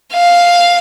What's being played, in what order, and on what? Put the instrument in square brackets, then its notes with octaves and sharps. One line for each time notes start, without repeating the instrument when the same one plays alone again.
[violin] F5